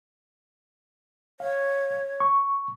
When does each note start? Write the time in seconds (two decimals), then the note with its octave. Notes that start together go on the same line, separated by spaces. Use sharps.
1.40 C#5 F5
2.20 C#6